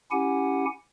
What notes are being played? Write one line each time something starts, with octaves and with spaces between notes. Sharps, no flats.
C#4 E4 G4 F#5 G#5